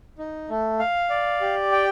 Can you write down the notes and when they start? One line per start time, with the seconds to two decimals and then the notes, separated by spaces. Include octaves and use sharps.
0.18 D#4
0.49 A3
0.79 F5
1.10 D5
1.41 G4
1.72 G5